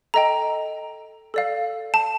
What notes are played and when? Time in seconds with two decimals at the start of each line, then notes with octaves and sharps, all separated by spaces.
0.14 A4 D#5 G5 A#5
1.34 A4 D5 F5
1.94 A5